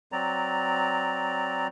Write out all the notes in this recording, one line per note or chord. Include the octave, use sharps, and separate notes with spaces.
F#3 C4 D5 A#5